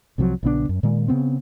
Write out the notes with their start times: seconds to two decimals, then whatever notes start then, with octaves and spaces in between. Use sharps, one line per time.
0.18 C2 C3 F3 F#3
0.43 A#1 C#3 B3 D4
0.69 F#2
0.83 A#2 D#3 G#3
1.08 C#3 B3 C4